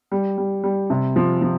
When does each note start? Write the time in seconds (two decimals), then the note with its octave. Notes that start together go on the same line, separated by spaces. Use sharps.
0.12 G3
0.38 G3
0.63 G3
0.90 C3
1.16 F3
1.42 F3